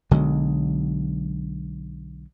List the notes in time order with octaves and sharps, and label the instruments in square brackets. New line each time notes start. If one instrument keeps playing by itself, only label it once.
[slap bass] B1 D3 F#3 G#3